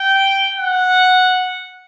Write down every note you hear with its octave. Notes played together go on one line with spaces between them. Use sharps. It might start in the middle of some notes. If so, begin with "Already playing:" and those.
Already playing: G5
F#5